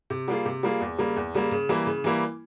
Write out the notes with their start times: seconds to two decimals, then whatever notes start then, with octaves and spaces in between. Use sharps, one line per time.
0.10 C3
0.28 G3 A#3 F4 G#4
0.45 C3
0.63 G3 A#3 F4 G#4
0.81 E2
0.98 C#3 G3 A#3
1.16 E2
1.34 C#3 G3 A#3
1.52 C#3
1.69 E3 G3 A#3 E4
1.86 C#3
2.04 E3 G3 A#3 E4